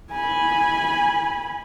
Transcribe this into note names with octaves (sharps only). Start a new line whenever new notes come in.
G#5 B5